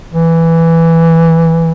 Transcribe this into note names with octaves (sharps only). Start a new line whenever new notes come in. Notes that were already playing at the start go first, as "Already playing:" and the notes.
E3